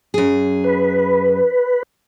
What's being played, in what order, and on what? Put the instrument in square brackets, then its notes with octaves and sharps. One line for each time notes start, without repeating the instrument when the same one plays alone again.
[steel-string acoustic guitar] F#2 G#4
[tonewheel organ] B4